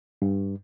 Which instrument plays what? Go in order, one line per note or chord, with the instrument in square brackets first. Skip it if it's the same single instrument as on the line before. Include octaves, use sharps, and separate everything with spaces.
[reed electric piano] G2